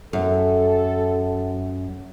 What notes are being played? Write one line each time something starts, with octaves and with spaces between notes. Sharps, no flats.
F#2 A4